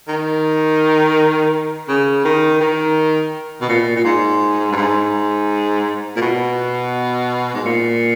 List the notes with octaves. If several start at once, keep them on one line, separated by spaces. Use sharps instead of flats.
D#3
C#3
D#3
D#3
B2
A#2
A#2
G#2
G2
G#2
A#2
B2
G#2
A#2